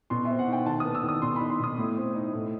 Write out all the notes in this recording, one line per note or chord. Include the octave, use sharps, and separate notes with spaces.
B2 C6
C4 E5
F#5
D#4 G5
D#3 A5
B3 D#6
E6
D#3
D#6
B2 C6
D#4 B5
C6
B2 D#6
A2
C4
D#4
A2